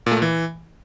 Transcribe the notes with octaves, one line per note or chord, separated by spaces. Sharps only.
A#2
A3
A#2
E3